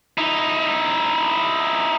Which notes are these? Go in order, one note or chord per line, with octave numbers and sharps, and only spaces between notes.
D#4 E4